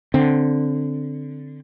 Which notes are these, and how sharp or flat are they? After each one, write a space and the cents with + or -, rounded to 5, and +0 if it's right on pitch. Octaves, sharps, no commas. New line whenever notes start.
D3 +0 C4 +0